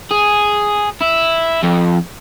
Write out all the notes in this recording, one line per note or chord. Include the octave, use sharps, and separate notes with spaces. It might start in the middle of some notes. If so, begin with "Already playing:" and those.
G#4
E4
F2